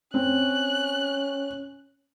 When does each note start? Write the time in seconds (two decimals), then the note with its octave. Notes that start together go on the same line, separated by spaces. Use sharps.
0.14 C4 C#4 F#6